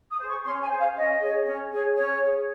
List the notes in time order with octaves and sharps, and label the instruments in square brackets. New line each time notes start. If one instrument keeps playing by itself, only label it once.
[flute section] D#6
G#4 C5
C#6
C#4 C6
G#5
G#4 C5
F5
C#4 D#5
G#4 C#5
C#4
G#4 C#5
C#4 C#5
G#4 C#5